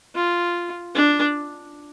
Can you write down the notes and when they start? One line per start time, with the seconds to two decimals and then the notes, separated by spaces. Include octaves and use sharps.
0.15 F4
0.94 D4